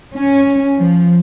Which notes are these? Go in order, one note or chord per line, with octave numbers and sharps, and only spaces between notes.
C#4
F3